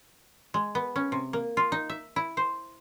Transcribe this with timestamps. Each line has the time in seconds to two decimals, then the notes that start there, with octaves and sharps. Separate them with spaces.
0.54 G#3
0.75 B3
0.96 C#4
1.12 C3
1.33 A#3
1.57 F4
1.72 D#4
1.89 E5
2.16 E4
2.37 C5